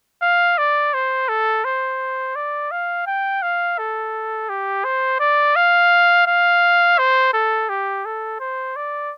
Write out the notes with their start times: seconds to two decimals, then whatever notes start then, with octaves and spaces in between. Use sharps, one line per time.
0.22 F5
0.58 D5
0.94 C5
1.29 A4
1.64 C5
2.36 D5
2.71 F5
3.07 G5
3.42 F5
3.78 A4
4.49 G4
4.85 C5
5.20 D5
5.56 F5
6.27 F5
6.98 C5
7.33 A4
7.69 G4
8.05 A4
8.40 C5
8.76 D5